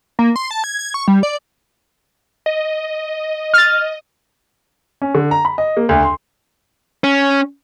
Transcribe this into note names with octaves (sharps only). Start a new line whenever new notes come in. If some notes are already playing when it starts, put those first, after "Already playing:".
A#3
C6
A5
G#6
G#6
C#6
G3
D5
D#5
F6 A6
C#4
D3
A#5
B5
D#5
A#3
D2
C6
C#4